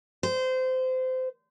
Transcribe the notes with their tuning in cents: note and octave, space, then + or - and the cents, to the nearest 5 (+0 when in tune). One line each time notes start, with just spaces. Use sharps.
C5 -25